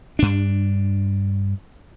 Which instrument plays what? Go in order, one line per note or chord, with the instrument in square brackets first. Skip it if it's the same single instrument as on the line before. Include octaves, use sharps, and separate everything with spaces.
[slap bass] G2 D4